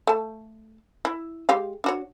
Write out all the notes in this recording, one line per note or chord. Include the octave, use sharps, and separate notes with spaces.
A3 A5
E4
G#3 G4 F5
D4 F#4 C#5